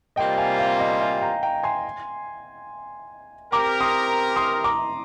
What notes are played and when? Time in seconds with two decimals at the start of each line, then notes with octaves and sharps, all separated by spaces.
0.16 C3 G3 A#3 F4 C5 D#5 G5
0.38 F5 G#5
0.59 F5
0.79 D#5 G5
1.01 F5 G#5
1.21 G5 A#5
1.43 G5 A#5
1.63 G#5 C6
3.52 C4 G4 A#4 A#5 D6
3.80 C6 D#6
4.36 C6 D#6
4.64 A#5 D6